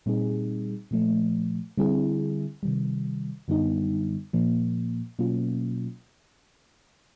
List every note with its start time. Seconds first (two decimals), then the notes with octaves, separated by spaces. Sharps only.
0.06 A#2 G3 C4 D#4 G#4
0.91 A#2 F3 A3
1.78 D3 G3 C4 E4 G#4
2.63 C3 D#3 G3
3.48 F#2 D3 G3 B3 D#4
4.33 A#2 F3 A#3
5.19 B2 F#3 A#3 C#4 F4